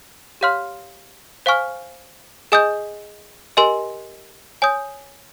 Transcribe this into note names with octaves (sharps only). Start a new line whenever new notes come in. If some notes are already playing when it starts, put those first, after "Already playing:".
G4 C#5 F5 C6 F6
C5 F5 G#5 C#6 F6
G#4 D#5 G#5 D#6 G6
G4 A#4 D#5 G#5 C6
C#5 G#5 D#6 G6